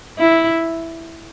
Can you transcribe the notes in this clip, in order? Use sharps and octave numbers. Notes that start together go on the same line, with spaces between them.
E4